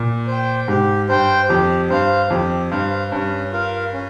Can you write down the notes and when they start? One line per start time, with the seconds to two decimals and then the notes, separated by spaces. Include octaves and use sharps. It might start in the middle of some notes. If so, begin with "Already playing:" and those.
Already playing: A#2
0.27 C5 G5
0.68 G#2 G4
1.09 G2 C5 G5
1.49 F2 G4
1.90 G2 C5 F5
2.30 F2 G4
2.71 G2 C5 F5
3.11 G2 C#4
3.52 F4 A#4 F5
3.93 C#4